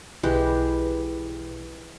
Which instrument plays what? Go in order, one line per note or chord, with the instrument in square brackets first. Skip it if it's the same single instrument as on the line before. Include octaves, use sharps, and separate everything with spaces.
[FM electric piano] B1 B4 [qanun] E3 G#3 G4